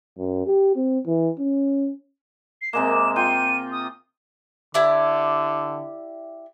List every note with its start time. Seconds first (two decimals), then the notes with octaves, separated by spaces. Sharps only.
0.18 F#2
0.47 G4
0.76 C4
1.06 E3
1.39 C#4
2.62 C7
2.73 C3 G#3 A#3 E7
3.16 F4 G5 D#7
3.72 D#6
4.74 D3 E4 G4 D5